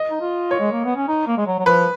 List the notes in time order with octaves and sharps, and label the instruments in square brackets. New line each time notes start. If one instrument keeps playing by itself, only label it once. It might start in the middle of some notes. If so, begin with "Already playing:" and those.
Already playing: [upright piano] D#5
[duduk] D#4
F4
[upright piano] C#5
[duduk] G#3
A#3
B3
C#4
D#4
A#3
G#3
F#3
F#3
[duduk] F3 [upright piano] B4